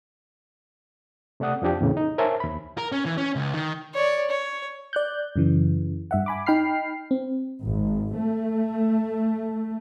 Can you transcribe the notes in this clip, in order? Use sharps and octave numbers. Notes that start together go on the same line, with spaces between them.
C3 A3 D5 F#5 D#6
F2 F3 D4 G4
E2 A2 C#3
D#4
A#4 C5 C#5 E5 G#5 A5
D#2 B5
A#4
C#4
E3
C#4
C#2
D#3
C#5 D5
C#5
D5 F#6 G6
F#2 C#3 E3
G2 E5 F#5
G#5 B5 D6
D#4 G5 B5 F6 C7
C4
G#1
A3